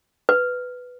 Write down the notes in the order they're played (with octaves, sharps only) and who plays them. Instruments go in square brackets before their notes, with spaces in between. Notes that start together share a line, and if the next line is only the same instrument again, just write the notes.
[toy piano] B4